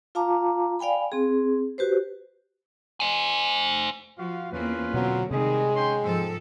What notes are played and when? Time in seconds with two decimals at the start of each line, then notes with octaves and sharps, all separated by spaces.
0.15 F4 F5 A5 A#5 D6
0.79 D5 F5 G5 G#5 B5
1.12 C4 G#4
1.78 F#4 G4 B4 C5
3.00 C5 G#5
4.18 F3 F4 F#4 F5
4.52 E2 A#3 C4 C#4 F4 B4
4.94 B2 D3 F#3 A#3 C4
5.31 C3 D#3 G3 G#3 G#4
5.74 C#4 G5 C6
6.03 G#2 F3 C4 A4